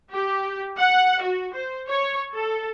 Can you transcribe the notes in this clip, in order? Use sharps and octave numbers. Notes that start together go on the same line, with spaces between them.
G4
F#5
F#4
C5
C#5
A4